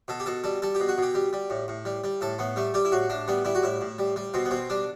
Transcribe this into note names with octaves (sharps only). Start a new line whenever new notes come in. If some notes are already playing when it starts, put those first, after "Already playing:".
B2 A4
G4
B2 A4
G3 A4
G3 A4
G4
B2
F#4
B2 G4
G3
G3
A2
A2
G3
G3
A2 A4
A2 B3
G3 A3
G3 G4
E4
A2 F#4
A2 D4
G3 B3
G3 E4
F#4
A2 E4
A2
G3
G3
B2 C4
B3
B2 C4
G3 D4